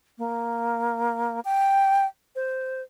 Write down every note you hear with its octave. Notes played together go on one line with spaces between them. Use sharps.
A#3
G5
C5